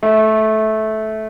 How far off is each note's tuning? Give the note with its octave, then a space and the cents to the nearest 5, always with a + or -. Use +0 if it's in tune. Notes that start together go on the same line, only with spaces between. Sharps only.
A3 -15